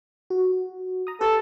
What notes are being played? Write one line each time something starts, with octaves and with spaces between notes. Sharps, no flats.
F#4
A#5 D#6
G4 A4 B4